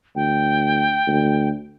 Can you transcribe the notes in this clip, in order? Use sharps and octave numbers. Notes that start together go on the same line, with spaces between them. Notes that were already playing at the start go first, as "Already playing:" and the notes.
D2 G5
D2